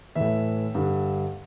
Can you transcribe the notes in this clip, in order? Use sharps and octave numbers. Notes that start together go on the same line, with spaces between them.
A2 E3 E5
G2 D3